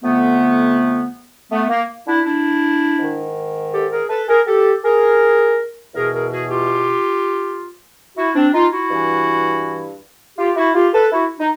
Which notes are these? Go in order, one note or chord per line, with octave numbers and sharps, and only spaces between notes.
F2 D3 A3 B3
A3 B3
A#3
D4 E4
D4 E4
G#2 D#3
G4 A4
G#4 A#4
A4 B4
G#4 A#4
G4 A4
G#4 A#4
E2 B2 G#4 A#4
G#4 A#4
F#4 G#4
F4 G4
E4 F#4
C4 D4
D#4 F4
E4 F#4
G2 E3
F4 G4
E4 F#4
F4 G4
A4 B4
E4 F#4
D#4